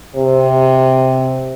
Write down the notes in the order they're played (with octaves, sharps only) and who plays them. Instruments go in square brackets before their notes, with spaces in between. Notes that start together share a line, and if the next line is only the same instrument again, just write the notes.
[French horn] C3